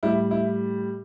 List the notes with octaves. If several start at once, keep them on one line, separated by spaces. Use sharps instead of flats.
A2 G3 E4
E4